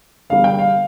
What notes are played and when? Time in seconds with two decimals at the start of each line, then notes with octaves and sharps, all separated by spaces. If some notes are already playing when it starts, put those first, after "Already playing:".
0.30 E2 D3 G3 A#3 F5
0.44 G5
0.59 F5